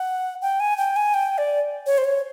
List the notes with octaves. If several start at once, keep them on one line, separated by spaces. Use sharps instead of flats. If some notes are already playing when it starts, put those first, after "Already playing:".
Already playing: F#5
G5
G#5
G5
G#5
G5
D5
C#5
C5
C#5